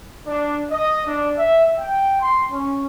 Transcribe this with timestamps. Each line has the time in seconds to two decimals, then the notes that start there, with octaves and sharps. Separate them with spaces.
0.27 D4
0.71 D#5
1.07 D4
1.37 E5
1.79 G5
2.21 C6
2.51 C#4